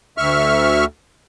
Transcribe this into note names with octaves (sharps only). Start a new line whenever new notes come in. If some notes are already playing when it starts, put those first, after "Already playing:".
D2 E5 C#6 F6